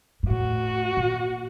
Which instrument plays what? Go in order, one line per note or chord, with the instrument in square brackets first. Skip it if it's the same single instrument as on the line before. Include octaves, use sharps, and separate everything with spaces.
[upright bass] G#2
[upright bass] A2 [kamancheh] F#4
[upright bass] A#2